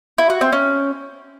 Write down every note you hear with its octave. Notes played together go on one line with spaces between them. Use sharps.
E4
F#4
C4
C#4